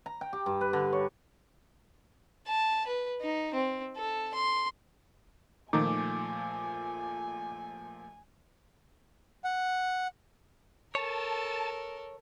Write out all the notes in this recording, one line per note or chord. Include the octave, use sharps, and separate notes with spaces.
A#5
G5
G4
G2
B4
D3
C#5
A5
B4
D#4
C4
A4
C6
A#2 D#3 F3 A3 D#4 G#5 D6
F#5
A4 A#4 C#5 A5